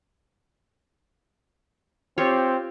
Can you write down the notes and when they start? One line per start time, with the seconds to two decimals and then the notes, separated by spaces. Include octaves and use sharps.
2.18 C4 F4 G4 C#5